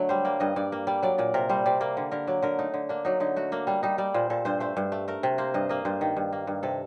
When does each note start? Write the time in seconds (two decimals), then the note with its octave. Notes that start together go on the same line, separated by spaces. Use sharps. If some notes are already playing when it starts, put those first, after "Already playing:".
Already playing: D3 F#3 A3
0.09 G3 C5
0.25 A#3 D5
0.40 G2 D#5
0.56 G2 D5
0.72 A#3
0.87 G3 D5
1.03 F#3 D5
1.18 A#2 D5
1.34 C3 A#4
1.49 G3 C5
1.66 C3 D5
1.81 A#3 D5
1.97 D3
2.11 D3 A#4
2.27 F#3 D5
2.42 D3 A#4
2.59 A3 D#4
2.74 D3
2.89 A#3 D4
3.05 F#3 D#4
3.20 D3 D#4
3.36 A3 F#4
3.52 A#3 D4
3.67 G3 D4
3.83 G3 D#4
3.98 G3 D5
4.14 A#2 C5
4.30 A#2 A4
4.45 G2 C5
4.60 A3 C5
4.77 G2
4.92 A3
5.08 A3 A#4
5.23 C3
5.38 A#3 C5
5.54 G2 D#5
5.69 A#3 D#5
5.85 G2 C5
6.01 D#3
6.17 G2
6.33 A#3
6.47 G2
6.63 C3 A4